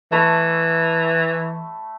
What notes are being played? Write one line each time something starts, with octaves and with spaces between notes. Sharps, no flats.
E3 A3 B5